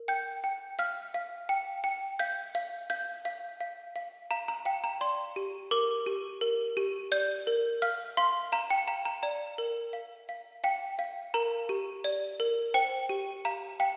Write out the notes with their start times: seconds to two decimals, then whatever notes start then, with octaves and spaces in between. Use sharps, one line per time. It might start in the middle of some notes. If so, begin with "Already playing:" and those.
Already playing: A#4
0.08 G5 G6
0.44 G5
0.79 F5 F6
1.14 F5
1.49 G5
1.84 G5
2.19 F5 G6
2.55 F5
2.90 F5 G6
3.25 F5
3.61 F5
3.96 F5
4.31 F5 A#5
4.48 A#5
4.65 F5 G5
4.84 A#5
5.01 D5 C6
5.36 G4
5.71 A#4 D6
6.06 G4
6.41 A#4
6.77 G4
7.12 D5 G6
7.47 A#4
7.82 F5 F6
8.17 F5 C6
8.52 F5 A#5
8.70 G5
8.88 F5 A#5
9.05 A#5
9.23 D5 A#5
9.58 A#4
9.93 F5
10.29 F5
10.64 F5 G5
10.99 F5
11.34 A#4 A#5
11.69 G4
12.04 D5
12.40 A#4
12.74 C5 G5
13.09 G4
13.45 F5 A#5
13.80 F5 G5